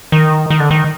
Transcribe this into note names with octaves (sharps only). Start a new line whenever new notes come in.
D#3
D#3
D3
D#3